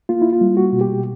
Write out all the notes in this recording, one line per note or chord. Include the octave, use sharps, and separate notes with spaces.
A#3 F4
E4
F4
G3
F#4
B2
G4